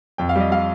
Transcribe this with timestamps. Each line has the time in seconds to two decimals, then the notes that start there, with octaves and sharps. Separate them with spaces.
0.18 F2 G5
0.29 F5
0.36 G3 D#5
0.51 G3 F5